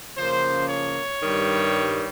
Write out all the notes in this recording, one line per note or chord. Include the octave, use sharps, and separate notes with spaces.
C#3 F3 A#3 C#4 C5
C#5
G2 D#3 G3